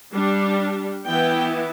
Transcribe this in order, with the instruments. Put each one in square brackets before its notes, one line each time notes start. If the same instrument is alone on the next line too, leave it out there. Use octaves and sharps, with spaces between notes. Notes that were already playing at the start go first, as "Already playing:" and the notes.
[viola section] G3 D4
E3 B3 E4 G5